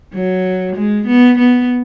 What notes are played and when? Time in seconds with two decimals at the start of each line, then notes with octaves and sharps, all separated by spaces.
0.13 F#3
0.76 G#3
1.06 B3
1.38 B3